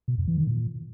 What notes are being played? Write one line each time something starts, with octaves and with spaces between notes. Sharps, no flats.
B2
F2
E3
D#3
A#2